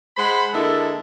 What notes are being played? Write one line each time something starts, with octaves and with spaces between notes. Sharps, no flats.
G#3 C5 F#5 B5
D3 G#3 A#3 E4 A4